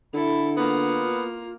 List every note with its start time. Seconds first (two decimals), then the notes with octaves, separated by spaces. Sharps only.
0.14 D3 E4 A4 B5
0.57 A#3 B3 F4